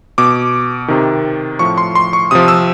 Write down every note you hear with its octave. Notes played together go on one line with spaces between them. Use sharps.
B2 D6
C3 D#3
A2 F3 C#6
C6
C6
C#6
C3 F3 D#6
E6